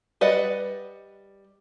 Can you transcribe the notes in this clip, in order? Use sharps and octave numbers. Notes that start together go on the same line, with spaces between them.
G3 B4 D5 D#5 F#5